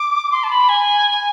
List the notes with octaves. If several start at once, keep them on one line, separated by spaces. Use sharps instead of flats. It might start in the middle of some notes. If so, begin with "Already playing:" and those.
Already playing: D6
C6
A5
B5
G#5